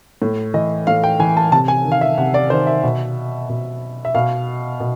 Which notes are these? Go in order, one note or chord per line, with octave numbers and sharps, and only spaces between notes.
A2
E3 D#5
A2 F5
G5
E3 G#5
A5
C3 A5
G#5
D#3
F5
E5
C3 F#5
D5
D#3 C5
E5
B2
B2
E5
B2 F5
B2